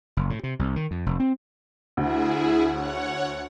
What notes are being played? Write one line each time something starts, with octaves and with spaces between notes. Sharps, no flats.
F#1
A2
C3
C2
D#3
F2
F1
C4
D2 E4 G#4
C#5 F#5